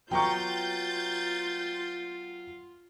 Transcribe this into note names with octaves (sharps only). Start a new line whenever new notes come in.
F#3 B3 F4 G5 A#5 C#6 G6 A6